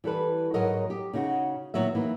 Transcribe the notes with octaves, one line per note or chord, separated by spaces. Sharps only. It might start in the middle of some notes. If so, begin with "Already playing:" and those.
E3 G3 A4 B4
G#2 F#3 G#3 A#4 C#5 D#5
G4
C#3 D#4 F#4 G#4
A#2 D#3 F#3 B3 E5
E3 A#3 D#4 E4